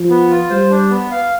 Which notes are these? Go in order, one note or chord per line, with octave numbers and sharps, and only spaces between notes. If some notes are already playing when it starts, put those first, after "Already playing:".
Already playing: F3
B3
F4
G3 C5
D4
B3
F5